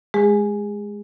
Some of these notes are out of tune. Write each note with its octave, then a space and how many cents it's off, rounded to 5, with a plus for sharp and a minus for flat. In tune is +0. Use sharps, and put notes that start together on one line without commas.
G#3 +5 G#4 -30